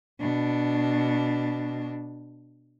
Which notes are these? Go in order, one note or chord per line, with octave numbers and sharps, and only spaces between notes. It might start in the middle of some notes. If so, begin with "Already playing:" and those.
B2 D4